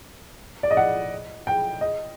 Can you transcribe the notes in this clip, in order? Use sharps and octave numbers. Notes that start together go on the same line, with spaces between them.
D5
D#5
F#5
G5
D#5